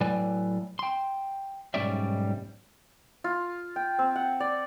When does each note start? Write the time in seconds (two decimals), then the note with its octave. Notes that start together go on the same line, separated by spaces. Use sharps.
0.01 A2 F#3 B4 D5 G#5
0.79 G5 C6
1.74 B1 G#2 G3 C#4 D5 E5
3.24 F4
3.76 G5
3.99 C4
4.16 F#5
4.40 D5